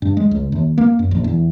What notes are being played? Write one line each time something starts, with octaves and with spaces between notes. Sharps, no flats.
G2
G#3
C#2
D#2
A#3
F#2
A#1
E2